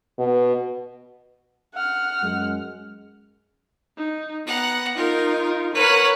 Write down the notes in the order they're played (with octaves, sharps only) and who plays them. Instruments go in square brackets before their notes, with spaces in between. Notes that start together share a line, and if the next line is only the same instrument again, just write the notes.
[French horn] B2
[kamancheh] F#5 F6
[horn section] F#2 G#3
[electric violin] D#4
[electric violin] B3 [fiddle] F#5 A#5
[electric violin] D#4 F4 [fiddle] A#4
[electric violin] A#4 C#5 [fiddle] B4 F#5